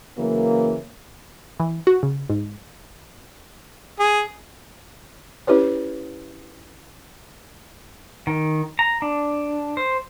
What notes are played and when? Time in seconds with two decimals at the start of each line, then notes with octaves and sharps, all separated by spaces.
0.18 C#3 E3 F#3 A#3
1.60 E3
1.87 F#4
2.03 C#3
2.30 G#2
3.99 G#4
5.47 C#4 E4 G4 B4 C#5
8.27 D#3
8.79 A#5
9.02 D4
9.77 C5